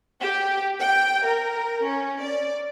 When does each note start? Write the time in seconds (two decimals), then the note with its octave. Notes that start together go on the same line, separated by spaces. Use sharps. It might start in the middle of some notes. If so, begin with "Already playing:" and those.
0.20 G4
0.79 G5
1.26 A#4
1.84 C#4
2.20 D5